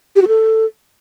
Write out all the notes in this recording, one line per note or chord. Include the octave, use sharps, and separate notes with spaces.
G4
F#4
A4